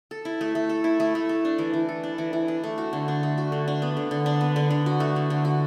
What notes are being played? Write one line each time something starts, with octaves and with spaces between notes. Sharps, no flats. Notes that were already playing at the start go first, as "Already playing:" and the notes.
A4
E4
A3
A3
A4
E4
A3
A3
A4
D4
E3
E3
A4
D4
E3
E3
D4
A3
F#4
D3
D4
A3
F#4
D3
D4
B3
D3
D3
D4
B3
D3
D3
F#4
A3
D3
D3
F#4